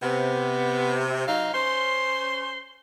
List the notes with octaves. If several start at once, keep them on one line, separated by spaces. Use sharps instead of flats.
C3 B3
F#3 D#4 F5
C#4 C5 C6